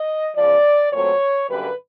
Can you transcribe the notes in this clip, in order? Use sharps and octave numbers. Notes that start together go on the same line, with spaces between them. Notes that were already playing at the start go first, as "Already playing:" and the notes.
Already playing: D#5
E2 C#3 F3 D5
A#2 F#3 A3 C4 C#5
F#2 D3 G3 A#3 B4